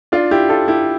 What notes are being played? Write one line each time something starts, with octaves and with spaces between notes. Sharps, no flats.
D4 F4
E4 G4
F4 A4
E4 G4